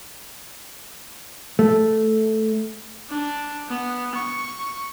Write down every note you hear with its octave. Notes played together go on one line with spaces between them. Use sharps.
A3
D4
B3
C#6